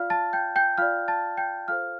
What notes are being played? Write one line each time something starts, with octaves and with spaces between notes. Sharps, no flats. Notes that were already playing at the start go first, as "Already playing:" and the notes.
Already playing: F4 D5 F5 F6
A5 A6
G5 G6
G5 G6
F4 D5 F5 F6
A5 A6
G5 G6
F4 A4 C5 F5 F6